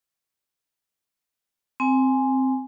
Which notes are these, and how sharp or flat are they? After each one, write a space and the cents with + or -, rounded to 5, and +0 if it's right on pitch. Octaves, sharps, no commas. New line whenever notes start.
C4 +0 G#5 +0